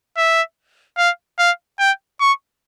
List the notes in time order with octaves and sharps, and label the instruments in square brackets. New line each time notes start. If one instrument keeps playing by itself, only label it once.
[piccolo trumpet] E5
F5
F5
G5
C#6